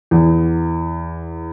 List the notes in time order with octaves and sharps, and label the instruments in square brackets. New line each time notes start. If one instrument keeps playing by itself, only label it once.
[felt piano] E2